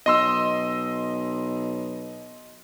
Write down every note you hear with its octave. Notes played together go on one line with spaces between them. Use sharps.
B1 D#5 C6 E6